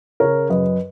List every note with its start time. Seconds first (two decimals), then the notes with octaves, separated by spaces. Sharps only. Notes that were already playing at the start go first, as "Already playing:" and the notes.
0.20 C#3 A#4 C#5
0.50 F#2 B4 D#5